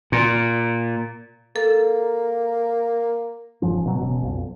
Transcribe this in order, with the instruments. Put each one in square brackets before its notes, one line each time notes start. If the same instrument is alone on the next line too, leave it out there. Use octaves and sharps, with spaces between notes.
[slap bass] A#2
[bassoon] A#3 [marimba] A4
[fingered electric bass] E1 G2 F3 C#4
B2 F#3 C#4
E1 B2 C#4
B1 F2